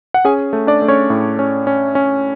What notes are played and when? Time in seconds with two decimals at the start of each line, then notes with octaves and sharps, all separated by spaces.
0.14 F#5
0.25 C#4 G#4 G#5
0.53 A3
0.67 D4 D5
0.82 A3
0.88 C#4 C#5
1.10 A2
1.39 C#4
1.67 C#4
1.95 C#4